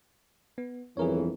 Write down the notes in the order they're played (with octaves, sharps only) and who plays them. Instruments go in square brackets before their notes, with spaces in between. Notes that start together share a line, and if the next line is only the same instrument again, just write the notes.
[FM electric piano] B3
[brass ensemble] G1 F2 E3 [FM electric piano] G#4 A#4 C#5